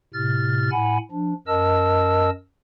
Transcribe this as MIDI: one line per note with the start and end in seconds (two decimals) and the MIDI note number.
0.14 0.70 45
0.14 0.70 48
0.14 0.70 89
0.14 0.70 93
0.71 0.98 45
0.71 0.98 78
0.71 0.98 80
0.71 0.98 83
1.11 1.33 53
1.11 1.33 62
1.47 2.30 42
1.47 2.30 70
1.47 2.30 75
1.47 2.30 81
1.47 2.30 88